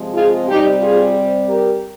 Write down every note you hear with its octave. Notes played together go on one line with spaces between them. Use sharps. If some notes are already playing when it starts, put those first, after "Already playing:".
Already playing: C3 F3 G#3 C4
F4 G#4
C3 G3 C4 D#4 G4
F4 G#4
G4 A#4